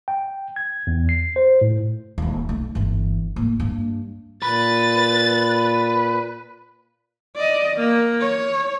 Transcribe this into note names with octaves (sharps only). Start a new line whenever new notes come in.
G5
G#6
E2
C7
C5
A2
D#1 D#2
B1 A3
G1 E3
A2 A#3
G2 A#3
A#2 B4 A6
D5 D#5
A#3
C#5